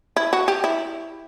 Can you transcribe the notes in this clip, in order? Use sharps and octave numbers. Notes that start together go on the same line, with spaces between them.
E4
F#4
G4
E4